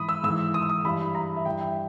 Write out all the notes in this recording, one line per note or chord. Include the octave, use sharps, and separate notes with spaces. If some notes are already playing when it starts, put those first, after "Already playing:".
Already playing: G#2 E3 B5 D#6
E6
G#2 E3 E6
D#6
E6
D#6
G2 E3 B5
A#5
E5
G2 E3 G5
E5